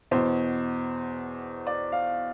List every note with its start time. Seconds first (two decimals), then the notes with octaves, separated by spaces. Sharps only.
0.11 E2 B2 C5
1.67 D5
1.92 F5